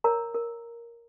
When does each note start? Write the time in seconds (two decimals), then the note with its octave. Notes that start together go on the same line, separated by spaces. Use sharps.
0.04 A#4 C#5 A#5
0.35 A#4